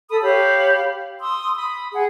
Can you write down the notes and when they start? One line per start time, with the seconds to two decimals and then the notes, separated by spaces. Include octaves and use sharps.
0.09 A4 B5 D#6
0.21 G4 C#5 F5 B5
1.20 C6 D#6 E6
1.55 B5 D#6
1.93 G#4 F#5